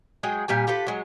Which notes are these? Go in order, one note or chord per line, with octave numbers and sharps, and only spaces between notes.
F#3 G#3 G#4 G5
A#2 G3 G4 G#5
F4 G4 A4 B4
F#3 G#3